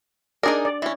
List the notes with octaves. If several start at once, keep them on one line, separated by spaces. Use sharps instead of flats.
D4 D#4 G#4 A#4 D5
D5
E3 C#4